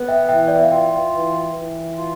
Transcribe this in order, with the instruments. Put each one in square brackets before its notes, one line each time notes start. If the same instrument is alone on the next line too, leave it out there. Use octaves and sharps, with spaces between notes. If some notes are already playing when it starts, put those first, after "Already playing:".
Already playing: [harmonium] B3
[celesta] E5 G5
[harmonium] E3 [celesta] E5 G5
[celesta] D5
E5
F5
[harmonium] F4 [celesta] E5 G5
[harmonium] E3
E3
F4